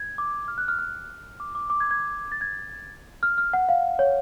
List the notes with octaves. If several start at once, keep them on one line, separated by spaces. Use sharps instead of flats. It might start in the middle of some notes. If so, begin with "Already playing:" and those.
Already playing: G#6
D6
F6
F#6
F6
F6
D6
D6
D6
G#6
G#6
A6
G#6
F6
F6
F#5
F5
C#5